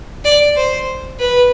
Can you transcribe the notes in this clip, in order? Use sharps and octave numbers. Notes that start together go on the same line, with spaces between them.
D5
C5
B4